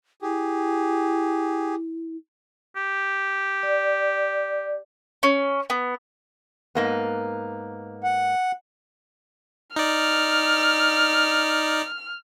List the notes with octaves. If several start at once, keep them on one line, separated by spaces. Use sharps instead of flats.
E4 G4 G#4
G4
D5
C#4
B3
G#2 A#3 B3
F#5
D#4 D5 F6